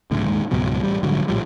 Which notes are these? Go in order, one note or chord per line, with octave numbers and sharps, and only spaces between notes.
C#2 F#2 A2 D3
D#1 D#2 G#2 G#3
C#2 G#2 B2 F#3
A1 G3
A#1 G#2 D3 F#3
A#1 A2 F3 G3